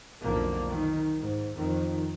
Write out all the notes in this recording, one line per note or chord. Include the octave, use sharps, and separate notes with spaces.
B1 F2 A#2 D3 A#3
D#3
G#2
F2 D#3